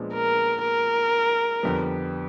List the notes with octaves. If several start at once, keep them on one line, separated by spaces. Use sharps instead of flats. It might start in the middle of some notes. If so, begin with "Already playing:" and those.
Already playing: A#2 F3 G#3 B3 D4
A#4
A#4
F2 D3 G3 B3